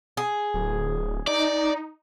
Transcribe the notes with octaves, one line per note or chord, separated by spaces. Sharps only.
G#4
D1
D#4 D5